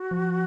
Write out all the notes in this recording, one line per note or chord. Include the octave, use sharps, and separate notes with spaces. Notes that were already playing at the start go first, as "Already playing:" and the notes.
Already playing: F#4
F3